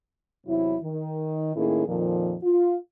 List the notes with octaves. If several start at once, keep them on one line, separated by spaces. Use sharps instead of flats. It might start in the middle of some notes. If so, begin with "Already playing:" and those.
E2 C3 F#3 E4
D#3
A2 D#3 A#3 C#4 E4 G#4
F2 A#2 D#3 F3
F4